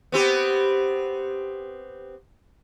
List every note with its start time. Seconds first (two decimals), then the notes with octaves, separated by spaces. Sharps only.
0.12 B3 C4 G4